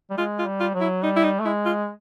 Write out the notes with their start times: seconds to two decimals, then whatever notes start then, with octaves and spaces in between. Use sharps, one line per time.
0.10 G3
0.17 G#3 F4
0.39 F4
0.46 G3
0.60 F4
0.74 F#3
0.81 E4
1.03 G3 D#4
1.16 E4
1.24 D#4
1.40 A3
1.45 G#3 E4
1.66 F4